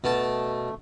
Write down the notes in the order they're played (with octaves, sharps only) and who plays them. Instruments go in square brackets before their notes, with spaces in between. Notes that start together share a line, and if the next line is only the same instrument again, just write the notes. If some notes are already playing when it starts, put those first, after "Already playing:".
[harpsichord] B2 A5 [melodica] A3